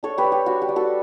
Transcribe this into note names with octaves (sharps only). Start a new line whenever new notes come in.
D4 A4 C#5
G4 B4
G3
G4
D4 F#4
G4
G3
F#4 A4